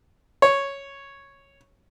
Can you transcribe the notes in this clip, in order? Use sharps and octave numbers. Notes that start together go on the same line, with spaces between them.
C#5